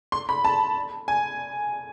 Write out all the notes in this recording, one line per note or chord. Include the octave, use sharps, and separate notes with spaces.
C6
B5
A5
G#5